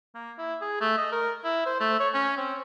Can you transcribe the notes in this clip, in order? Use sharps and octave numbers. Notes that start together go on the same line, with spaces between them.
A#3
E4
G#4
A3
D#5
A#4
E4
C5
A3
C#5
C#4
C4